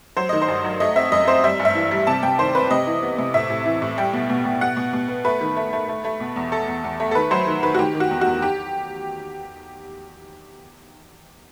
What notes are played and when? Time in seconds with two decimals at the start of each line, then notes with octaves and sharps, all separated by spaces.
0.17 F#3 C5
0.29 D#3 D#5
0.42 C5
0.48 G2
0.64 F#3
0.80 A3 D#5
0.96 C4 E5
1.12 F#2 D#5
1.28 C4 C5
1.44 G3 E5
1.59 G2
1.65 E5
1.75 E3
1.91 G3
2.07 C3 A5
2.23 C3 G5
2.39 D#3 C5
2.55 C4 B4
2.70 C3 D#5
2.87 E3
3.02 B3
3.18 C3
3.34 A2 E5
3.50 A2
3.66 E3
3.82 A2
3.98 G3 G5
4.13 B2
4.30 B2
4.45 B2
4.61 B2 F#5
4.77 B2
4.93 B2
5.09 B3
5.25 A3 B4
5.41 D#3
5.57 A3
5.73 A3
5.88 A3
6.04 A3
6.20 B2
6.36 E2
6.51 A3 A4
6.68 E2
6.84 E2
7.00 A3
7.11 A4
7.15 D#3 B4
7.31 F#3 C5
7.47 D#3
7.63 D#3 B4
7.74 F#4
7.79 D#3 G4
7.95 D#3
8.00 F#4
8.11 E2
8.21 F#4
8.27 E2
8.42 G4